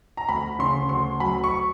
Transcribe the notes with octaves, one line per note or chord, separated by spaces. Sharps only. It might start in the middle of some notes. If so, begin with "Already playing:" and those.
A#5
D2 B5
C#3 C6
D2 C6
F#3 B5
C#6